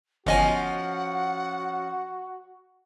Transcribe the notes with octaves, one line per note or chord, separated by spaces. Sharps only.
G1 F3 C#4 F#4 D#5 F#5 G#5